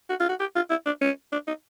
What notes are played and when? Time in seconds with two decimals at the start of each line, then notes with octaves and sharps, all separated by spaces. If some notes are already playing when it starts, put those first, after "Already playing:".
0.09 F#4
0.20 F4
0.29 F#4
0.40 G4
0.55 F4
0.70 E4
0.86 D4
1.01 C#4
1.32 D4
1.47 D#4